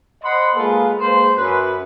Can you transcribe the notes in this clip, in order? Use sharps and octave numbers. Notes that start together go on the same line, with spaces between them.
C5 D#5 F#5 B5 C6
G#3 A#3 F4 A4 B4
G#3 A#3 B4 C5
F#2 B4